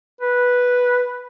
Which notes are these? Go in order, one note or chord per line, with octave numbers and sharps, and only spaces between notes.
B4